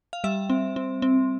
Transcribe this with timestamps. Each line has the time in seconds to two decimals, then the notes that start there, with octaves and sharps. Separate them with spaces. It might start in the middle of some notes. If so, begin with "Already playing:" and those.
0.13 F5
0.24 G3 E5
0.50 C4
0.76 C4
1.02 C4